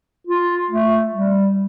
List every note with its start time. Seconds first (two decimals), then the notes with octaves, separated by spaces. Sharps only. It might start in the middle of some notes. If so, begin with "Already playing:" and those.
0.27 F4
0.71 A3
1.14 G3